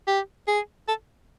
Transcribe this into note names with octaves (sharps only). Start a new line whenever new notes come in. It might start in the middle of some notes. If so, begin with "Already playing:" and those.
G4
G#4
A4